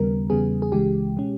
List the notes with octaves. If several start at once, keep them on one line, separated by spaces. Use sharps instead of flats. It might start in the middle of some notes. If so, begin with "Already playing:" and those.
Already playing: D#2 C#3 G3 B3 A#4
E2 C#3 G3 B3 G#4
G#4
C#2 C#3 E3 G#3 G4
B2 G#3 C#4